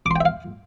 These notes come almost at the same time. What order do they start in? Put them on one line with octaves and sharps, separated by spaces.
D6 C6 G5 E5 F5